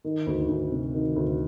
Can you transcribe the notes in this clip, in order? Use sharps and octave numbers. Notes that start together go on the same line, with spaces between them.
D#3
D2
D2
C3
D#3
D2